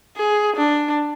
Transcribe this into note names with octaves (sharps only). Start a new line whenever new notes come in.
G#4
D4